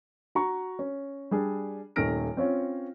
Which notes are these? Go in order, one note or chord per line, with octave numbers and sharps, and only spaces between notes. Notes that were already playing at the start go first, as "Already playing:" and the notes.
F#4 A#5 C#6
C#4
G3 D4 G#4
D#1 A3 D#4 F6 A#6 D7
C4 C#4 F4 C#5